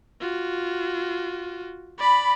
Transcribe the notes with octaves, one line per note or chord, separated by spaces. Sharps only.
F4 F#4
D5 B5